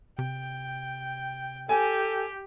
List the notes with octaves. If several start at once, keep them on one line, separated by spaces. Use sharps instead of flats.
C3 G5
G4 A4 G#5